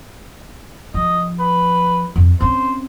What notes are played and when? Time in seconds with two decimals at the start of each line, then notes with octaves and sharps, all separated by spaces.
0.94 F3 D#5
1.40 B4
2.16 F2
2.41 C4 C#4 C5